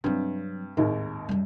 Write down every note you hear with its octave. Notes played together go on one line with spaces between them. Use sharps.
G2 C3 F#3 C4
G#1 D#2 A2 A#4
F#2 G3